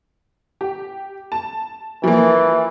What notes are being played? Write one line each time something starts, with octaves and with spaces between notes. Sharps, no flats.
G4
A5
E3 F3 A#3